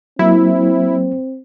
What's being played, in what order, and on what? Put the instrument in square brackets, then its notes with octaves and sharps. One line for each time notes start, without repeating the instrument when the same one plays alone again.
[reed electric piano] F#3 A#3 [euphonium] C4 [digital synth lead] E4